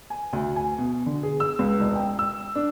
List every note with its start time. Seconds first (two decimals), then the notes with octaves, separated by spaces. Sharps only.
0.10 G#5
0.33 D2
0.56 G#5
0.78 B2
1.06 D3
1.23 G#4
1.40 E6
1.59 C#2
1.80 E1
1.96 G5
2.19 E6
2.55 D4